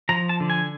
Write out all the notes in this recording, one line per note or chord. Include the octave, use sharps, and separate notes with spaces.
F3 A#5
A5
D3
G#5